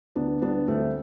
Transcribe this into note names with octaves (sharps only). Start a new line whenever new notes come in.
D2 B3 D4
G3 B3 D4
D2 A3 C4